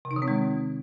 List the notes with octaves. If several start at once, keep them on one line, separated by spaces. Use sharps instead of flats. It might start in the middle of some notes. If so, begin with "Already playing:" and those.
C3
D#4
D#3
C4
G#3